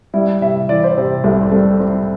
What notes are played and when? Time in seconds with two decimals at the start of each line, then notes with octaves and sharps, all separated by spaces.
0.14 G3 E4
0.41 C3 E5
0.69 E3 D5
0.84 C5
0.97 C3
1.24 C2 A3
1.41 C4
1.52 G3 A3
1.80 G3 C4